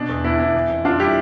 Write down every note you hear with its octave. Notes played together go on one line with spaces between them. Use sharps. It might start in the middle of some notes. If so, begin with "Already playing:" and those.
Already playing: B2 D4
E2
E2 E4
B3 E4
E3
F2
F2 D4 F4
G3 E4 G4